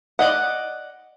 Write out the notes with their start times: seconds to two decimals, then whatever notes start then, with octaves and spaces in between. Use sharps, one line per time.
0.19 D5 D#5 F#5